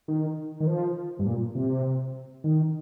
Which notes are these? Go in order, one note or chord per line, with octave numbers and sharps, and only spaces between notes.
D#3
D#3
F3
G2
A#2
C3
D#3